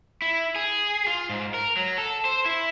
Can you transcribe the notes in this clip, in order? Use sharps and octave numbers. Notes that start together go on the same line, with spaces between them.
E4
G#4
F4
G#2
A#4
F#3
A4
C5
E4